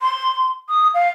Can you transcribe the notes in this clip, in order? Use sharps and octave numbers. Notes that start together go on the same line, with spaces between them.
C6
D#6
F5